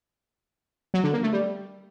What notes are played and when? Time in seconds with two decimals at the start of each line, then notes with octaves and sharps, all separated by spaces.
0.94 F#3
1.04 D3
1.13 A#3
1.23 A3
1.33 G3